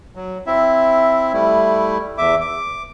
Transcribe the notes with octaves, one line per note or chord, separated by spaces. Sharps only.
F#3
C4 E4 E5
G3 A3 E4
E2 E5 D6
D6